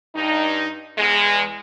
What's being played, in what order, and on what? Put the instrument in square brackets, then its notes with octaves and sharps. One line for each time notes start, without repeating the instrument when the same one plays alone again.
[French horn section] G2 D#4
E2 G#3